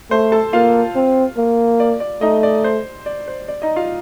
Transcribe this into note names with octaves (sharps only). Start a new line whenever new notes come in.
A3 C5 C6
A4 A5
A#3 F4 F5
C4
A#3
D5
D5
A3 D#4 D#5
D5
C5
D5
C5
D5
D#4 D#5
F4 F5